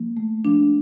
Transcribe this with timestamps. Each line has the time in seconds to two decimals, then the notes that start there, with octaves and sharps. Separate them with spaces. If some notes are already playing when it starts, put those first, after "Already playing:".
Already playing: F3 A#3
0.17 A3
0.45 F3 D4